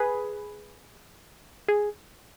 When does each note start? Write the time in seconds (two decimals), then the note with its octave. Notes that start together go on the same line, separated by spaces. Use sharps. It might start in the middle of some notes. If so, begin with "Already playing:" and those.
Already playing: G#4 B4
1.68 G#4